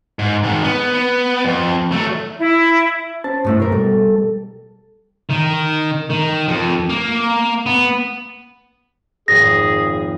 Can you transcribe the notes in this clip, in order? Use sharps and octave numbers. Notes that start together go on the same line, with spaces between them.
G#2
G#2 D#3
B3
B3
F2
F#3 A3
E4
C#4 C5 A5
G2 A3 E4
B1 A#4
B2 G3 A4
D#3
D#3
F2
A#3
B3
G#1 F2 A#2 G#4 A#6